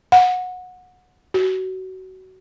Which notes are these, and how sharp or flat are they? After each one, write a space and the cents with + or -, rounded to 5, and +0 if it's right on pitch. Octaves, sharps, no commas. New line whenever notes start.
F#5 -20
F#4 +20